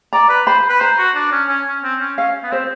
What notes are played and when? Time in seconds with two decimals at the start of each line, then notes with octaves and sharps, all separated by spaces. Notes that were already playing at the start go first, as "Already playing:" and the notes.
0.13 D5 A#5
0.29 B4
0.47 C5 B5
0.69 B4
0.81 C5 A#5
0.98 F#4
1.16 D4
1.32 C#4
1.49 C#4
1.66 C#4
1.83 C4
2.01 C#4
2.18 C#4 F5
2.44 B3
2.51 C4 C5